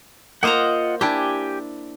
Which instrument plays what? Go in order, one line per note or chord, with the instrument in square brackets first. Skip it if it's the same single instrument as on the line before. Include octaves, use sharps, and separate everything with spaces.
[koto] A#3 C5 A#5 [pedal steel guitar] F4 D#5 F#5
[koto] D4 E4 [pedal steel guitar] G4 G5 G#5